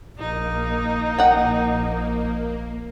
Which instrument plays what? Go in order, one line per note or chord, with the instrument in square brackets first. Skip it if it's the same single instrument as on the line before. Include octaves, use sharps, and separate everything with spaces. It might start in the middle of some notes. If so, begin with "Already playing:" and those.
[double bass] A#1 [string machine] A#3 [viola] D#4
[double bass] A#1 [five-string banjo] F#5 G5